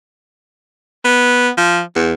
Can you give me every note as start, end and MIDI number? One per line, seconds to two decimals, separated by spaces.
1.05 1.50 59
1.57 1.80 53
1.95 2.13 40